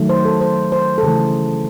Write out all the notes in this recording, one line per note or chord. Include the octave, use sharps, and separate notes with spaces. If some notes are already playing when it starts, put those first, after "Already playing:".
Already playing: D#3 F#3 A3
C5
A4
C5
C5
A4
C#3 E3 A3 G#4